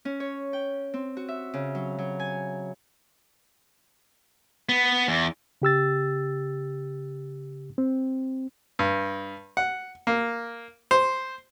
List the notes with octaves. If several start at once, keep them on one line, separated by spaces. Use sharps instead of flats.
C#4
C#5
G5
C4
F#4
E5
C#3
F#3
F#3
G#5
B3
E2
C#3 G4 E6 A6
C4
G2
F#5
A#3
C5